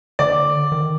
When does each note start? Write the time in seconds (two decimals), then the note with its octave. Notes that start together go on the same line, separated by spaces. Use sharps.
0.19 D3 D5 D6
0.72 D#3